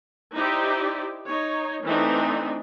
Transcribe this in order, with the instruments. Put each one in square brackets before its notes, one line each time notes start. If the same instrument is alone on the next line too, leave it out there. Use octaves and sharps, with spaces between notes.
[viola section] D#4 E4 G4 C5 D5
D#4 C#5
E3 A3 C4 D4 D#4